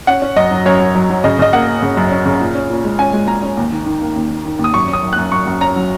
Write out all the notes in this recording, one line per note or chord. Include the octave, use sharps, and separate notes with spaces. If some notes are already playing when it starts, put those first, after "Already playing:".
C#4 F#5
C#4
F#2 D#5
F#3
F#2 C#5
F#2
F#3
F#3
C#3 D#5
C#3 D#5
A#3 F#5
A#3
C#3
F#2
C#4
C#3
A#2
C#4
A#2
G#3
C#4 G#5
G#3
G#3 A#5
C#4
D#2
D#3
D#3
A#3
D#2
D#3
D#3
D#2
D#6
F#2 C#6
C#4
D#6
F#2
F#6
F#2
F#2 C#6
F#2
C#4 A#5
F#3